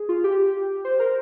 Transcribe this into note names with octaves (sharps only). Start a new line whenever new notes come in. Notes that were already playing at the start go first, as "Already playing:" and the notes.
Already playing: G#4
F4
G4
C5
A#4